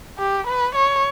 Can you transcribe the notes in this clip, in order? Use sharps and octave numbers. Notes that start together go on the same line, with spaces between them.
G4
B4
C#5